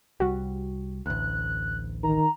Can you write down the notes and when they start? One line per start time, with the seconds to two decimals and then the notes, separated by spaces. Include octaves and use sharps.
0.20 C2 G3 F#4
1.06 A1 D2 F#6
2.03 D#3 A#5